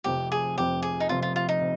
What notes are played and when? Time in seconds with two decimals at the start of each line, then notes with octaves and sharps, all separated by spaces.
0.04 F1 F2 C3 G4
0.32 G#4
0.57 F1 F2 C3 G4
0.82 G#4
1.00 D#4
1.09 F1 F2 C3 F4
1.23 F4
1.36 F4
1.49 D#4
1.61 C3